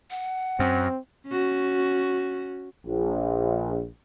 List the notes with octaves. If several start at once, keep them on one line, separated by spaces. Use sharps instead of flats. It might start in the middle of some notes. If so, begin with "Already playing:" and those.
F#5
F#2 C4
C#4 F#4
A#1